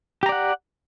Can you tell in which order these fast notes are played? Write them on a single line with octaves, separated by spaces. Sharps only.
G4 A#5 D5 F#5